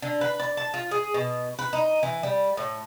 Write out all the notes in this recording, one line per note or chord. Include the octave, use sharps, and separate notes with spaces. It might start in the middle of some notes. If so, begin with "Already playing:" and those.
D3
B4
D5
A5
F4
G#4
B2
B4
D#4
E3
G3
A2